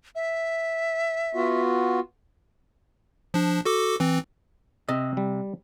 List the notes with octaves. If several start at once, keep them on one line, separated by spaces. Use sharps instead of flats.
E5
B3 F4 F#4
F3 D4
F#4 A4 D6
E3 C4
C3 D#5
G3